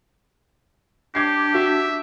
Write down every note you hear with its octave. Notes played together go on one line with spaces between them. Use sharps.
D4 G4 D6 G#6 C7
F#4 E5